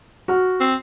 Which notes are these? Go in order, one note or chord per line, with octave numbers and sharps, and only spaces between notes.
F#4 F6
C4